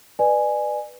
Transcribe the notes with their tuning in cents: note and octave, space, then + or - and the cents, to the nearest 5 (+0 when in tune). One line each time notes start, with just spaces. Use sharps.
B4 +0 D5 +35 G#5 +0